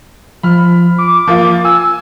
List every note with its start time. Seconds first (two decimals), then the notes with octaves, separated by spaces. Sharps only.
0.43 F3 B5 F6
0.98 D6
1.28 F3 A#3 F4
1.65 G#5 E6